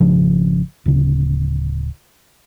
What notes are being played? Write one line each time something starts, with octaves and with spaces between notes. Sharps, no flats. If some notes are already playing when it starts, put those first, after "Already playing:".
G#1 C#3 F3
D1 C#3